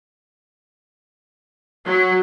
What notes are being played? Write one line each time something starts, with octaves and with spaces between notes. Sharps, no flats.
F#3